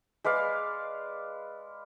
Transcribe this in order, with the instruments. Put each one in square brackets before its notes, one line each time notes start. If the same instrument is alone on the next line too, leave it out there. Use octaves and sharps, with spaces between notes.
[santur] G#3 B4 D5 F5